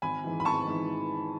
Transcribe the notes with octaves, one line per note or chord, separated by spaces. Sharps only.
G#1 G#5 B5
G#2 E3
B5
G#1 A5 C#6
G#2 E3